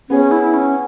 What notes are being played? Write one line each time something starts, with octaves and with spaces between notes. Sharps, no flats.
B3 C#4 G#4 C#5
E4
C#4